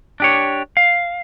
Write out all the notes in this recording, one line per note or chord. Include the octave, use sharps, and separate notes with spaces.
D4 G4 C#5
F5